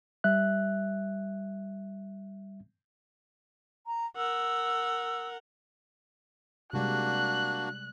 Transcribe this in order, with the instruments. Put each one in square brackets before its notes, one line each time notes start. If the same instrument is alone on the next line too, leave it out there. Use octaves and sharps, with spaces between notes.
[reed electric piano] G3 E5 F#6
[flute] A#5
[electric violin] A#4 F#5 [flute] E6
[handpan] C3 G3 G#3 [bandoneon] A#3 D4 F#4 [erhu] F#6